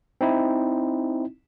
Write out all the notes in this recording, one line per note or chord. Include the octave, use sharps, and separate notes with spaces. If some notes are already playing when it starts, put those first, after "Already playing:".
C4 D#4 E4